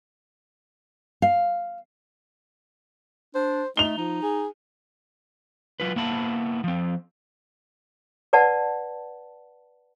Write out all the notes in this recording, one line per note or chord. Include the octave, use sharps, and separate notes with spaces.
F5
D4 C5
A3 D#4 F7 G7
F3 D#4
G#4
F#3 F4 B4
A#3 B3 E4 A5 B5
F3 C4
B4 D5 F#5 A5